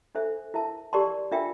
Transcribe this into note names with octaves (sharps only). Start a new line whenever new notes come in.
D4 A4 C5 E5
E4 A#4 E5 A5
G4 A#4 D5 A5 C6
D4 F4 A#4 E5 G5